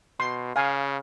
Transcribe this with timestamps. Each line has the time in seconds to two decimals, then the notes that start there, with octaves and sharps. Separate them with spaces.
0.20 B2 C6
0.56 C#3 F5 G#5